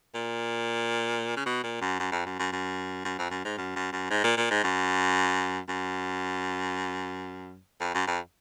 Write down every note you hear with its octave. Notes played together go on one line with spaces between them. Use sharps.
A#2
C#3
B2
A#2
F#2
F#2
F2
F#2
F#2
F#2
F#2
F2
F#2
G#2
F#2
F#2
F#2
G#2
A#2
A#2
G#2
F#2
F#2
F2
F#2
F2